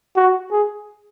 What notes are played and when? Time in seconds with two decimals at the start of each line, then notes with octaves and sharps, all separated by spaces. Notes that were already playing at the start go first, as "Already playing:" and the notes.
0.16 F#4
0.52 G#4